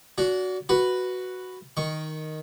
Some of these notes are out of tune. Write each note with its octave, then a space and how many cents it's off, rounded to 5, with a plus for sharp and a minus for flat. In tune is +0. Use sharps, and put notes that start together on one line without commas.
D4 -35 F#4 +0
F#4 +0 B4 +0
D#3 +0 C#6 +0